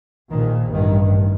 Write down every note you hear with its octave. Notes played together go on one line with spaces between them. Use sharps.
A#1 A#2 D#3
A1 G2 D#3